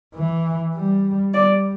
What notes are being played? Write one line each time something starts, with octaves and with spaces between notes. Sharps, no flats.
E3
G3
G3 D5